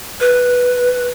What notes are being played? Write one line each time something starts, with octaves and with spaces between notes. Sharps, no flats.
B4